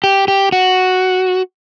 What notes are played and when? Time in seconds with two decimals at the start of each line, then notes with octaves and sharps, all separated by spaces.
0.04 G4
0.28 G4
0.52 F#4